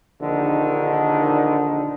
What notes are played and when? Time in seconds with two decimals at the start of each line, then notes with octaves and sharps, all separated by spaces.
0.21 A#1 D3 D#3 D#4